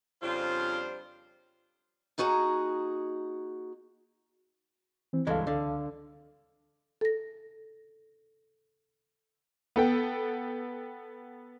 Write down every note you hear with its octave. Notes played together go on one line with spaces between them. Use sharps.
F2 C#3 G3 D4 F4 C5
A#3 D#4 F#4 G#4 A5 A#5
E3 C4
C#2 G2 E3 G#3 A4 F5
D3
A4 A#6
B3 A4 G5